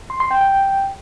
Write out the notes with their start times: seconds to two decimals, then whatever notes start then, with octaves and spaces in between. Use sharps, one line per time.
0.10 C6
0.20 C6
0.31 G5
0.41 G5